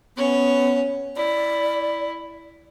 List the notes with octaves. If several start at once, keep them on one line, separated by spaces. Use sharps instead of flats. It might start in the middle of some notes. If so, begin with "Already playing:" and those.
B3 C#4 C#5
E4 D5